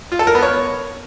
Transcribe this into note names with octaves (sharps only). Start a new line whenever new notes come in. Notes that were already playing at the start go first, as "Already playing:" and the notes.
F4
A4
A#4
B3
C#5